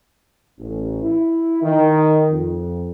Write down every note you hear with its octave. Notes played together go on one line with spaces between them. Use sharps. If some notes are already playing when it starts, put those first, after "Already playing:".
A1
E4
D#3
F2